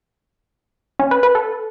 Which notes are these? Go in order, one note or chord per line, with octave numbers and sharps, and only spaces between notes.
C#4
B4
B4
A4